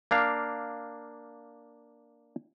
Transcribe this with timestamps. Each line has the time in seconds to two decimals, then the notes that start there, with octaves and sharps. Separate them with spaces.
0.11 A#3 D4 F5